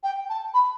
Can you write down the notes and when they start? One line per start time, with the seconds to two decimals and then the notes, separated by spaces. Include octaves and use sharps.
0.03 G5
0.29 A5
0.54 B5